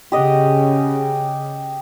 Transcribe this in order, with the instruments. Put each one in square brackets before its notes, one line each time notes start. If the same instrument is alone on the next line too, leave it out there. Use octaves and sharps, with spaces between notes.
[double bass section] C#3 [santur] G4 D#5 F#5